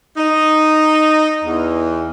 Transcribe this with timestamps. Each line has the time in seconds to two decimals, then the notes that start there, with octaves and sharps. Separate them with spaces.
0.17 D#4
1.45 E2